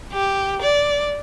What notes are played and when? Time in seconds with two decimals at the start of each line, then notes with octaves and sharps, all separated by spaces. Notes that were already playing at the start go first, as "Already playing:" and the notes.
0.12 G4
0.61 D5